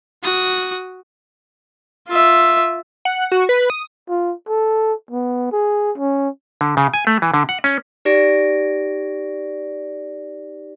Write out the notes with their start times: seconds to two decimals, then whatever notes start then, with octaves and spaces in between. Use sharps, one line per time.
0.23 F#4 D#6
2.08 F4 E5
3.05 F#5
3.32 F#4
3.49 B4
3.70 D#6
4.09 F4
4.49 A4
5.11 B3
5.52 G#4
5.98 C#4
6.61 D3
6.77 C#3
6.94 G#5
7.07 A3
7.22 E3
7.34 D3
7.49 F#5
7.64 C#4
8.05 D#4 G4 D5 A#6 D7